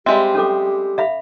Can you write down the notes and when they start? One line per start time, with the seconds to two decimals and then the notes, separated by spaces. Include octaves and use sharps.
0.06 G3 G#3 C4 G4 E5 F5
0.35 C#4 A4 D6
0.98 E5 F5 B5